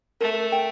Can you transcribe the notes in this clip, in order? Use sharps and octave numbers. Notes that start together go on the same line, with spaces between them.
A3 A#4
G5